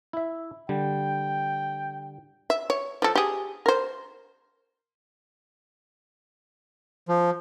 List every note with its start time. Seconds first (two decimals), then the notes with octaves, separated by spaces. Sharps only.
0.13 E4 E5
0.69 D3 G3 G5
2.50 E5
2.70 C#5
3.02 F3 A4
3.15 G4 G#4
3.66 A#4 C5
7.09 F3